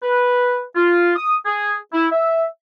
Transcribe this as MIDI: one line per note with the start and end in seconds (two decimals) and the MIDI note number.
0.03 0.63 71
0.76 1.12 65
1.16 1.35 87
1.46 1.76 68
1.93 2.07 64
2.12 2.45 76